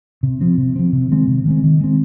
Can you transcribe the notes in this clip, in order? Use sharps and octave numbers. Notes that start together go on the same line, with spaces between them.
C3
F3 C4
C3
F3 C4
C3
D#3 G#3 C4
C3
D#3 G#3 C4
D#3
G#3 C4